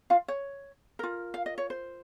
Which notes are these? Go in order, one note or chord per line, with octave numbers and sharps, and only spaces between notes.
F4 F5
C#5
F4 A#4
F5
D#5
C#5
C5